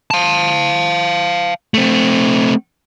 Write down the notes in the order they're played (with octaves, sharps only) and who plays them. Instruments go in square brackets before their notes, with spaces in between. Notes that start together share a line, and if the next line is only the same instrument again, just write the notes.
[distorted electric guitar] F5 A5
A3 C4